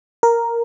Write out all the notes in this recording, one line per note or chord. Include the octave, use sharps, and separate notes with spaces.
A#4